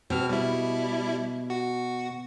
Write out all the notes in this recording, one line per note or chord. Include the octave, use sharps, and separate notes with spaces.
B2 C4 F6
G3 E4
F#4